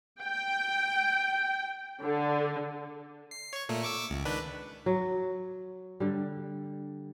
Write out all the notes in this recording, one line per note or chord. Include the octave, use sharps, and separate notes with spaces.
G5
D3
C7
C#5 C#6
A#2 A3 A#3
C#6 D6 E6
C#2
D#3 D4 B4
F#3
D3 G3